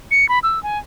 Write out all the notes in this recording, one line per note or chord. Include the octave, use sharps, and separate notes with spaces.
C#7
B5
E6
G#5